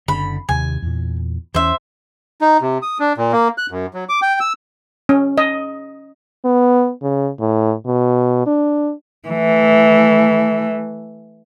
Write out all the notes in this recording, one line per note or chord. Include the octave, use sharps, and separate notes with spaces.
F#1 D3 C4 B5
D#2 C3 G#5
E2 A#2
E2 E3 C#4 C5 E5
D#4
C3
D#6
D4
A#2
A#3
F#6
F#2
F#3
D6
G5
E6
C#4
D#5
B3
C#3
A2
B2
D4
E3 A3